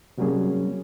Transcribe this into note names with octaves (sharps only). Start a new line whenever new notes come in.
C3 F#3 G3 A#3 C#4 G#4